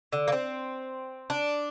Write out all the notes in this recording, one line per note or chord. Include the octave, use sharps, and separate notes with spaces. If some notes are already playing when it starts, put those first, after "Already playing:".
D3
A#3
C4
D4